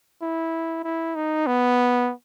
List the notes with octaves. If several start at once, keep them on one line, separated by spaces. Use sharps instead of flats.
E4
E4
D#4
B3